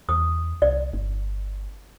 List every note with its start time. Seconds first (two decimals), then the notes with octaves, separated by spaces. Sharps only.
0.09 E2 D#6
0.62 C2 D5
0.93 G1